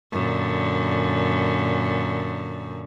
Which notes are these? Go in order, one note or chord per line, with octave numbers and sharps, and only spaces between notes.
F#2 A#2 D3